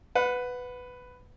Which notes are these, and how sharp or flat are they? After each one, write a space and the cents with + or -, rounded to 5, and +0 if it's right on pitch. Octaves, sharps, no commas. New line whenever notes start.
B4 +10 F#5 -20